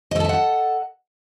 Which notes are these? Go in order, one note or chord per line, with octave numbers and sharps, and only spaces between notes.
A4 D#5 E5 F#5 A5